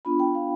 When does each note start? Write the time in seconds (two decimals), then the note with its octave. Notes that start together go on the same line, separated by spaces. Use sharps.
0.05 B3 D4 F4 B5
0.20 G5
0.35 F5